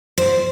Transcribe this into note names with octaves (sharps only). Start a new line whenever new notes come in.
C5